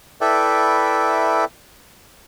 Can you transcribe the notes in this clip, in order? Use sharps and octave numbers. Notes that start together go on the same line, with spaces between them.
E4 A4 B4 D5 E5 G5